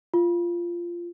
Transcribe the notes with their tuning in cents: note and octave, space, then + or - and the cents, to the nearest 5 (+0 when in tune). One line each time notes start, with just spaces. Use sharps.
F4 -10